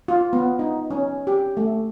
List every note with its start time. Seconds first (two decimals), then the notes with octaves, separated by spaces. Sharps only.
0.08 F4
0.33 B3
0.59 D#4
0.91 C#4
1.27 G4
1.57 A3